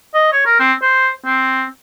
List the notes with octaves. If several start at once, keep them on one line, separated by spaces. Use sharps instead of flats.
D#5
C#5
A#4
C4
C5
C4